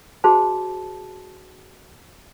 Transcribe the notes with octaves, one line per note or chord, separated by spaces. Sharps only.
F#4 G#4 C5 A5